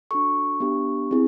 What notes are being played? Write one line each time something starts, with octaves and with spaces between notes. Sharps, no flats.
D4 F#4 A4 C#6
B3 D4 G4
C4 E4 G#4